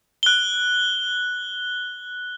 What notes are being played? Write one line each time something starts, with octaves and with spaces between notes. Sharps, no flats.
F#6 G7